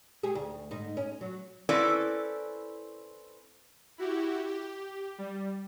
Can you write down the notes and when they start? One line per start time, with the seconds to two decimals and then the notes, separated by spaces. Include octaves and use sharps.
0.23 A3 G4 G#4
0.35 D2
0.71 G#2 D#4
0.97 C#4
1.21 F#3
1.69 C4 C#4 E4 A4 B4 D5
3.98 E4 F#4 G4
4.47 G4
5.18 G3